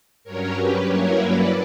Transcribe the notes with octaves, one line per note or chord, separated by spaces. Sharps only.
G2 F#3 C#4 A#4 C#5
G4 B4
G2 F#3 A#3 C#4 E4 A#4 C#5
B4 D5